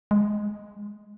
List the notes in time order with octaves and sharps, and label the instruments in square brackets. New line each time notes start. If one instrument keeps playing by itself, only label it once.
[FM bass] G#3